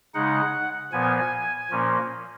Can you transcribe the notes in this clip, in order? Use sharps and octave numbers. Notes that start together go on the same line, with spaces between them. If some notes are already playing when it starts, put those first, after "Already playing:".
C#3 G#3 D#4 F#5
A#2 F3 B3 G#5
A#2 F3 A#3 C#4